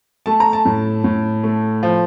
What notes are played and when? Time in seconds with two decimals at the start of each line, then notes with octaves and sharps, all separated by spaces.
0.26 A3 A5
0.40 A#5
0.53 A5
0.65 A2
1.04 A2
1.43 A3
1.83 F3